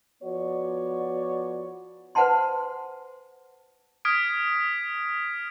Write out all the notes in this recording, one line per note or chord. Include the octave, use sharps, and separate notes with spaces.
F3 B3 F#4 C#5 D5
B4 C5 F#5 G#5 A5 C6
D#6 F6 G#6 B6 D7